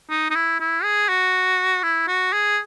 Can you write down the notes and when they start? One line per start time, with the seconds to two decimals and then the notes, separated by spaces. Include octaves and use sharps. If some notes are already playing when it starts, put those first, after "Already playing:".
0.10 D#4
0.30 D#4
0.35 E4
0.60 E4
0.83 G#4
1.09 F#4
1.83 E4
2.07 F#4
2.33 G#4